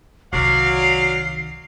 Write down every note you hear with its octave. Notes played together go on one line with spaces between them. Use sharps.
C2 D#3 F#3 D5 F5 C7